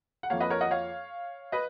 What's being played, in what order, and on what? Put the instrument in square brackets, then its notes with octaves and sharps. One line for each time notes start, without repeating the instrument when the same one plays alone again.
[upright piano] F#5
F2 F3 A#3 C#5 F5
B4 D#5
A#4 C#5
D#5 F#5
C#5 F5
B4 D#5